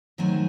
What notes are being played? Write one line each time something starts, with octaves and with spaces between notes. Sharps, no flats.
D#3 F#3 A3 C4 G#5